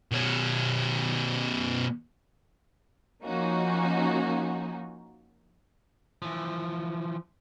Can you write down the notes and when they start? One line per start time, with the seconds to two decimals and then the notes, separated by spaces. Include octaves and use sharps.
0.12 B2 C#4
3.24 F3 A#3 C#4 D#4 F#4
6.22 E3 F3